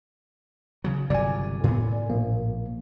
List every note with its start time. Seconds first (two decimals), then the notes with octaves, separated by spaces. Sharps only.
0.84 C#3 F#3
1.10 G1 C3 F#3 D5 G#5
1.64 A2 B3
2.10 A#1 A#3